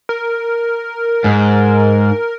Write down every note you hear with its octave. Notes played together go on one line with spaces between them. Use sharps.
A#4
G#2